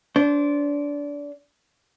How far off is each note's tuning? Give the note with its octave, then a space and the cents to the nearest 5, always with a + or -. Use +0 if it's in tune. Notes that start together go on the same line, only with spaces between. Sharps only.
D4 -25 C5 +0